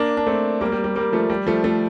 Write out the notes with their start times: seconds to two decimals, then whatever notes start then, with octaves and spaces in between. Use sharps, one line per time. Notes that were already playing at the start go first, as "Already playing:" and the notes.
Already playing: A#3 D4
0.17 D4
0.27 A3 C4
0.61 G3 A#3
0.72 G3
0.84 G3
0.96 G3 A#3
1.12 F3 A3
1.30 G3
1.47 F3 A3
1.64 F3 A3